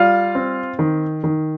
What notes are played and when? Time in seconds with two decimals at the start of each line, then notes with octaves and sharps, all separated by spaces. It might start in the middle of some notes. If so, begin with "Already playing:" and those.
Already playing: G3 F4 F5
0.35 C4
0.79 D#3
1.24 D#3